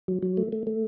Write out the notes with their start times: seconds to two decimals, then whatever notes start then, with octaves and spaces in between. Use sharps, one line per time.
0.08 F#3
0.22 F#3
0.37 A3
0.52 A3
0.67 A3